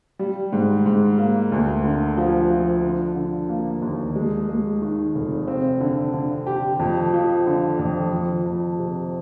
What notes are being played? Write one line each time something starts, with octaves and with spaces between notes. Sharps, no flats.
G3
G#2
G#2
A#3
D2
D3
F3
F3
D3
D3
A#3
D#2
G#3
G#3
D#3
F1
C4
D3
D3
G4
F2
F3
D3
F2
F2
F2
C3